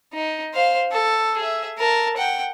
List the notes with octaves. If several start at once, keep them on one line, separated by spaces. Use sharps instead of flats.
D#4
C5 F5
A4
G#4 E5
A#4 A5
F#5 G5